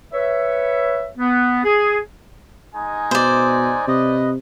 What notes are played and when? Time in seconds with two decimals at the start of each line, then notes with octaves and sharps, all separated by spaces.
0.13 B4 C#5 E5
1.18 B3
1.64 G#4
2.76 G#3 D#4 G#5
3.11 B2 C5 D5
3.88 C3 B4 D#5